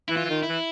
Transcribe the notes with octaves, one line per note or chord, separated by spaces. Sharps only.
E3 E4
F4
E3
D#3
E4
E3